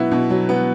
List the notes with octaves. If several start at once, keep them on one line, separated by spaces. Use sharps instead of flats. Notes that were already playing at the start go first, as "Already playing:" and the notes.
Already playing: B2 F#3 B3 E4
B2
F#3
B3